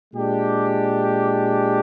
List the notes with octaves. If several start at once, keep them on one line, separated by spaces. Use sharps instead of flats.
A#2 G#3 D4 G4